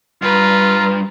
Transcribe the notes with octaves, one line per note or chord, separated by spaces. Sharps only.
G2 F4 B4 A#5